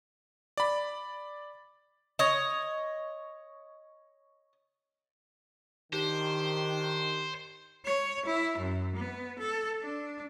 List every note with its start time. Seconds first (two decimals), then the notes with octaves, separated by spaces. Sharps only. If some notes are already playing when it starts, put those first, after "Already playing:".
0.57 D5 B5
2.19 C#5 D#5
5.93 D#3 D4 G4 C5
7.85 C#5
8.25 E4
8.58 F#2
8.95 B3
9.38 A4
9.82 D4